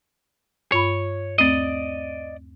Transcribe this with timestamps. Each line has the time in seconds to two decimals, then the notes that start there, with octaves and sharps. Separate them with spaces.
0.72 G2 F4 C#5 B5
1.38 D#2 A3 C4 D5 D#5